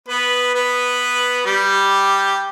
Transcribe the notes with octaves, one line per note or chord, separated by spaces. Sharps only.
B3 B4
B3 B4
G3 G4